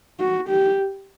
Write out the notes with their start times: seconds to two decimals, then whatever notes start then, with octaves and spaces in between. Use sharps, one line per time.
0.20 F#4
0.49 G4